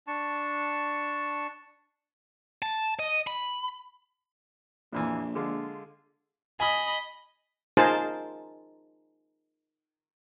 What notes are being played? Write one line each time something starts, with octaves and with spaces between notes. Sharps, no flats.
D4 A5 C#6
A5
D#5
B5
A#1 F2 A#2 E3
D3 G#3 F4
D#5 G#5 B5 D#6
D#4 F4 G#4 A#4 C5 A5